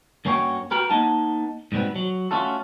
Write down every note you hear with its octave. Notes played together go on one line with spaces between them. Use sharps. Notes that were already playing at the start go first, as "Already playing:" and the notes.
G2 A#3 C#4 F#4 C#5 G5
F#4 G4 A#4 B4
A#3 B3 D#4 F#5 A5
G#2 B2 G3 B3 C4
F#3
A3 C#4 F4 F#4 A4